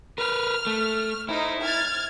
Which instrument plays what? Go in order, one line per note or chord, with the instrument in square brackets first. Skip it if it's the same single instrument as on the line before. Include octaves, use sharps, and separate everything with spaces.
[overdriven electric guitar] A#4 B4 [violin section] F6
[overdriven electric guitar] A3
[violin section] D#4 C5 [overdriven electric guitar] E4
[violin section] F6 G#6 A6